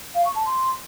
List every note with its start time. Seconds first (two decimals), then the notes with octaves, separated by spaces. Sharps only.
0.15 F5
0.25 C#6
0.35 A5
0.46 C6